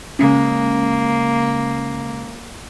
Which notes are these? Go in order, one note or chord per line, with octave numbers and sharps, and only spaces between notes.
C#3 G#3 A#3 C#4